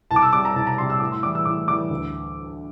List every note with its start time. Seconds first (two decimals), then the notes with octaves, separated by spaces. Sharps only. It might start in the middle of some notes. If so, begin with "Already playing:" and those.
0.11 C2 A5
0.16 D6
0.22 E6
0.33 C3 G3 D6
0.45 A#5
0.56 C2 A5
0.67 A#5
0.78 C3 G3 C6
0.90 E6
1.00 A2 D6
1.12 C6
1.23 E3 G3 D6
1.35 E6
1.45 A2 D6
1.68 E3 G3 D6
1.91 D2